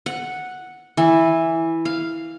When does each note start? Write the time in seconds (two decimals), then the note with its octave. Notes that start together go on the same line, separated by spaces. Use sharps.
0.06 F#5
0.97 E3
1.85 F5